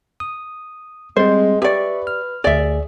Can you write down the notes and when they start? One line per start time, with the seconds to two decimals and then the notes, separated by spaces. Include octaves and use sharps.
0.20 D#6
1.16 G3 G#3 C4 C5
1.62 G4 B4 D5 E5 C#6
2.07 F6
2.44 D2 G#4 D5 E5